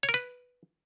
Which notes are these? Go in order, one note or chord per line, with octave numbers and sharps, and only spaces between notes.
C#5
A#4
B4